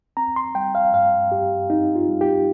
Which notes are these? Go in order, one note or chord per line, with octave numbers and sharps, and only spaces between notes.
C4 A#5
C6
G3 G5
F5
G2 F5
G2 G4
C4 D#4
F4
G3
G4